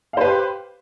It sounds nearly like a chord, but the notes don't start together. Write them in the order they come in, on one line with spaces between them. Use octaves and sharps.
F5 C5 B4 G4